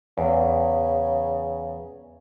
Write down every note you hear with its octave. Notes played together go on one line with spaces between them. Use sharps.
E2 C#3